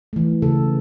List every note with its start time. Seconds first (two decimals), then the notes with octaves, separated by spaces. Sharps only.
0.13 E3 A3
0.42 C#3 A4